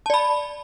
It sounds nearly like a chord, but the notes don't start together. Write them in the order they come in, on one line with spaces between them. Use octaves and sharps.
A5 D5 B5